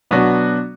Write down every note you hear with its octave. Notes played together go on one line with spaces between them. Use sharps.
B2 F#3 B3 D4 F#4